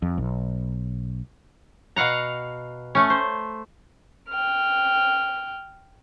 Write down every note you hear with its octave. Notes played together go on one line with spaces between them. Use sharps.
F2
B1
B2 F5 F#5 A#5
A3 C#4
C5
G5 F6